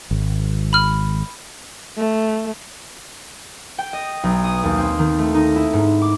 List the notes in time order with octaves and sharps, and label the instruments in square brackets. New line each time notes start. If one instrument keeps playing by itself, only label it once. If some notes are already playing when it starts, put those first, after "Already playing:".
[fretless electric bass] G#1
[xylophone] B5 F6
[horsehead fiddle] A3
[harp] G5
D#5
B1
D#6
D#2
C4
D#3
A3
D#4
E4
G#2
D6